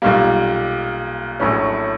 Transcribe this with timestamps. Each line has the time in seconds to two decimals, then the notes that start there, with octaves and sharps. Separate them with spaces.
0.02 B1 A#2 G3 A#3
1.40 A#1 A2 F#3 A3 C#4